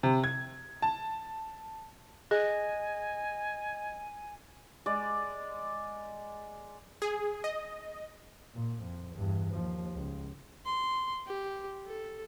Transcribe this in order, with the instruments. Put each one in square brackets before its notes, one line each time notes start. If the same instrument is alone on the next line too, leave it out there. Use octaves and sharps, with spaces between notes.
[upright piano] C3
G#6
A5
[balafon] G#4 [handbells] D#5 [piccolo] G#5
[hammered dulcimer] G#3 D5
[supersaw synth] G#4
D#5
[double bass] A#2
F2
E2 G2
D#2 F3
C#2
[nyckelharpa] C6
G4
A4